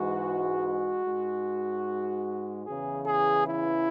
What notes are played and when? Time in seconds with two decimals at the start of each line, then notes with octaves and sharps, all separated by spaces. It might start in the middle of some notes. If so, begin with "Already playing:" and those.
Already playing: G#2 E3 G#3 F#4
1.05 G#2 G#3
2.65 E2 C#3 E3 G#4
3.06 G#4
3.46 E4